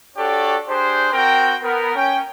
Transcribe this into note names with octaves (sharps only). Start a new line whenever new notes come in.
D4 F#4 G4 A4 C#5 D5
D4 G4 G#4 C5
C4 F#4 A#4 G5
B3 A#4
C#4 G5